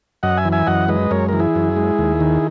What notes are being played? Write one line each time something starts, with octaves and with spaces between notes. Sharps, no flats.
F#2 D#5 F#5
E5 G#5
E3
E5 G#5
F#2 D#5 F#5
G#3 B4 D#5
F#2 A#4 C#5
E3 A#4
E4 G#4
F#2
G#3
D#2
D#3